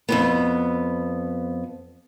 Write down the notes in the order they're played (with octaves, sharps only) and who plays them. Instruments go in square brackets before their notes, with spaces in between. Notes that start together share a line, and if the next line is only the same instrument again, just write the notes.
[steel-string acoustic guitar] F2 G#2 B3